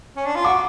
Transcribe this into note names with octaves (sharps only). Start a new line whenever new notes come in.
C#4
D4
F4
F#4 D6